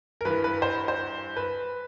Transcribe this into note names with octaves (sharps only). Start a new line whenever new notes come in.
A#4
G2 E3 B4
B4
C5
C5
B4